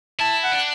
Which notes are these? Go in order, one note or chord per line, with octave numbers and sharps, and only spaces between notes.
E4 A5
F#5
D4